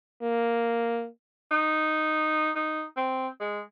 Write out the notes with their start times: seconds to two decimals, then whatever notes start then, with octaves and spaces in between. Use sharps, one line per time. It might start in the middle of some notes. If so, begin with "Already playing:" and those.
0.22 A#3
1.51 D#4
2.55 D#4
2.97 C4
3.41 G#3